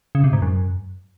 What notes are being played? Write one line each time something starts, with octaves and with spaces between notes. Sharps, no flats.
C#3
C3
G#2
F#2